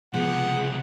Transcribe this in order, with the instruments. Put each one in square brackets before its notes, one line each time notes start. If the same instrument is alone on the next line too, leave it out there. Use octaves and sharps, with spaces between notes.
[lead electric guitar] C#2 C3 [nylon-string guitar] F3 B3 [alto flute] G#4 [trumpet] F#5